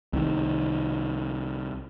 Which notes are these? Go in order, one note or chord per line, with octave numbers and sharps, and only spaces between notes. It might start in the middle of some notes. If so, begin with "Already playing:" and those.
C2 D#3